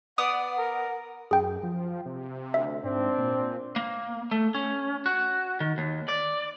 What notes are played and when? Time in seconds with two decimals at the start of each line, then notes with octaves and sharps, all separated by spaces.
0.18 B3 D5 F#5 D#6
0.58 A#4
1.31 F#2 G#4 G5
1.63 F3
2.06 C3
2.54 D2 E5
2.84 G#2 C4 D4
3.18 A#2
3.76 A#3
4.31 A3
4.55 C#4
5.06 F#4
5.60 D#3
5.78 D#2
6.09 D5